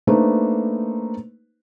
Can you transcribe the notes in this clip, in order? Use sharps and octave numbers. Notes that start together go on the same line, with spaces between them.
A3 A#3 D4 D#4 B4 C5